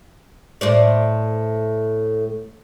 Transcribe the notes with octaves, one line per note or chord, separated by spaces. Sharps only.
A2 C5 D5